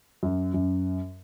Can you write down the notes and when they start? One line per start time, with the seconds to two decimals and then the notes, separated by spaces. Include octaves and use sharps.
0.23 F#2
0.54 F#2